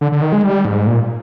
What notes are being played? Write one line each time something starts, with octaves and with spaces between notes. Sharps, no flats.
D3
D3
D#3
G#3
G3
G#2
A#2